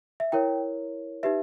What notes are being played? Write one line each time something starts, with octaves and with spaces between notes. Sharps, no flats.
E5
E4 A#4 C#5 G5
D#4 G4 B4 E5